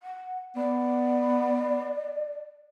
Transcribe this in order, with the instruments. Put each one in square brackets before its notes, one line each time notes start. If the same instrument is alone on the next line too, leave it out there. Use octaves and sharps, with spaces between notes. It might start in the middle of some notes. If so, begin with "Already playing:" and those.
[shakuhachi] F#5
[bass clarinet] B3 [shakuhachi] D5